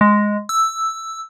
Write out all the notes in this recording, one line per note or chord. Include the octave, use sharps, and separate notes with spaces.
G#3
E6